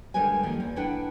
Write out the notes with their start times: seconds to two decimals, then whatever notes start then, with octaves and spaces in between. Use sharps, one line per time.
0.14 D3 G3 G#3 A#4 B4 G#5
0.43 D#3 F3 G3 A#3
0.60 E2
0.76 D4 E4 B4 F#5 G5